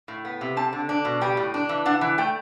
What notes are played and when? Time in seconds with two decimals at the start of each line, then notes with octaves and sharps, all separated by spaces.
0.08 A2
0.25 B3
0.41 C3
0.57 C4 A5
0.73 D3
0.89 D4
1.05 B2
1.21 G3 G5
1.37 A2
1.54 D4
1.69 E3
1.86 D4 F#5
2.01 E3
2.18 A3 G5